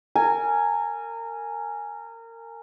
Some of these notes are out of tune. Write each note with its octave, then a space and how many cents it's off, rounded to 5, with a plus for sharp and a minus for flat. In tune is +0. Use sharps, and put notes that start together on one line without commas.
A#4 -25 G#5 +0